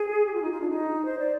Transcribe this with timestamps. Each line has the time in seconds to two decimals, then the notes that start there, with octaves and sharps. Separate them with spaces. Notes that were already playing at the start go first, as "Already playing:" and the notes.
Already playing: G#4
0.26 G4
0.34 F4
0.42 D#4
0.51 F4
0.61 D4
0.69 D#4
1.05 C5
1.19 D5